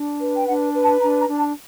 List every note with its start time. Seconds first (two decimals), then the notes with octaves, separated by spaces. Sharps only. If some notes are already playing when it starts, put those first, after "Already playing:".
Already playing: D4
0.20 B4
0.36 G5
0.47 D4 F#5
0.73 B4
0.83 A5
1.00 D4 A#5
1.19 A#5
1.28 D4
1.37 A5